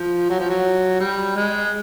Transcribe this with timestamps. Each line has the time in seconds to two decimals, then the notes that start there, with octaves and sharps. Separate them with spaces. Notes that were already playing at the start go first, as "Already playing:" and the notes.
Already playing: F3
0.30 F#3
0.40 F3
0.49 F#3
1.00 G3
1.36 G#3